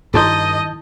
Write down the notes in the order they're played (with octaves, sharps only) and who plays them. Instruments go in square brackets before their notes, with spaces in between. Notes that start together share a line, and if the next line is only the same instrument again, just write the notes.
[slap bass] G2 [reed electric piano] D#3 A5 G6 [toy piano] E4 F#4 A4 [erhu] D#5